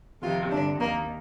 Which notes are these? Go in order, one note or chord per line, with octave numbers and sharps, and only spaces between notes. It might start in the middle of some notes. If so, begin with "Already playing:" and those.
F2 C3 D#3 F4
G2 D3 D4
D#2 D#3 A#3